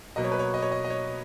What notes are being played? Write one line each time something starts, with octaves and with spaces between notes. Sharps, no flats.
B2 F#3 A#3 D#5
C#5
B4
C#5
D#5
C#5
D#5
D#5
C#5